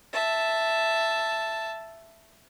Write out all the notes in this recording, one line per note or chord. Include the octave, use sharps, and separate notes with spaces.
E5 A5